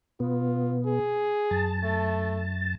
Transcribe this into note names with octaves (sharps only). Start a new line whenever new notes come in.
B2 B3 F4
G#4
F#2 A5
A3